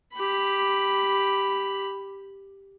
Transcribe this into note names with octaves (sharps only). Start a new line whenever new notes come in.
G4 B5